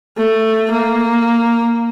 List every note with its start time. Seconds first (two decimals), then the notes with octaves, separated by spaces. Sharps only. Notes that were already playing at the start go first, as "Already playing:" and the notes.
0.18 A3
0.71 A#3